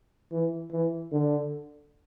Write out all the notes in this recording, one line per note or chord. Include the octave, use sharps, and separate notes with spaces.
E3
E3
D3